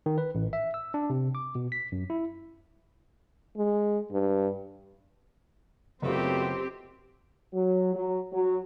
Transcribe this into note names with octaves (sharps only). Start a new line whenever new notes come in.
D#3
B4
A1
E5
E6
D4
C3
D6
B2
B6
F#2
E4
G#3
G2
F#1 F#3 A3 B3 C4 F4 G4
F#3
F#3
F#3